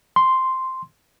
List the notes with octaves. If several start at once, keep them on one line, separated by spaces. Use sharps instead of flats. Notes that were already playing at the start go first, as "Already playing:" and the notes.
C6